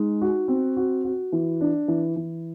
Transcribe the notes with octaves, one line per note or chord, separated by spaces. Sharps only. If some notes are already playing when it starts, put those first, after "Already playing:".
Already playing: G#3 D#4
F#4
C4
F#4
F#4
E3
D4
E3
E3